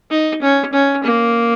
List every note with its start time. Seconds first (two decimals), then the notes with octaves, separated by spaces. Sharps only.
0.11 D#4
0.42 C#4
0.73 C#4
1.04 A#3